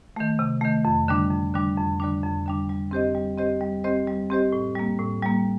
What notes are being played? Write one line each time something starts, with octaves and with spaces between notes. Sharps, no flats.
D#3 A3
C3
D#3 A3
F2
D3 G3 D4
F2
D3 G3 D4
F2
D3 G3 D4
F2
D3 G3 D4
G3
C4 G4 C5 D#5
G3
C4 G4 C5 D#5
G3
C4 G4 C5 D#5
G3
C4 G4 C5 D#5
A2
G3 A#3
A2
G3 A#3